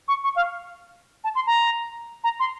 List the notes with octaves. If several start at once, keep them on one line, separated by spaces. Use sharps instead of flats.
C#6
C#6
F5
A5
C6
A#5
A#5
C6